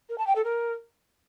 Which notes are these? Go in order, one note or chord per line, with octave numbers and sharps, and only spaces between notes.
A#4
A5
G5
A4
A#4